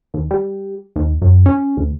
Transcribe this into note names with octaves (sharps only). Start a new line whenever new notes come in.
D#2
G3
D#2
F#2
C#4
D2